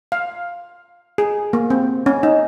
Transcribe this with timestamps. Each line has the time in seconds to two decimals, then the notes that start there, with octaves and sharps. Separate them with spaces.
0.12 F5
1.18 G#4
1.53 A#3
1.70 C4
2.06 C#4
2.23 D#4